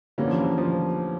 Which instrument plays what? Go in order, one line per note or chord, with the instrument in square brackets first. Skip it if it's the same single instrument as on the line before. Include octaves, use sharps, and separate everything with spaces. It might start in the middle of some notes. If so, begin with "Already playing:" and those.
[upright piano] D3 G3 A#3 C#4 [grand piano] E3
[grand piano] F3
E3
F3